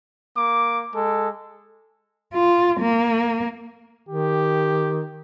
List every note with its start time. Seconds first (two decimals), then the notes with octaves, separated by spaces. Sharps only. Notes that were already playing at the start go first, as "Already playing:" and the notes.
0.37 A#3 D6
0.93 G#3 A4
2.34 F4
2.80 A#3
4.09 D#3 G4